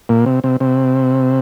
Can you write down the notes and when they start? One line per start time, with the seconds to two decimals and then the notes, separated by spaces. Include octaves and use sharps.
0.09 A#2
0.26 C3
0.44 C3
0.60 C3